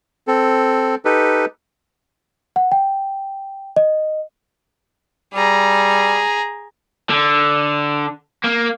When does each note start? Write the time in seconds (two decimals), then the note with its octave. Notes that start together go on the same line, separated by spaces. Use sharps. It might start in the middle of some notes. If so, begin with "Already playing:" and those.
0.28 C4 A4
1.05 D#4 G4 A4 B4
2.56 F#5
2.72 G5
3.76 D#5
5.34 G3 G#4 A#5
7.10 D3
8.44 A#3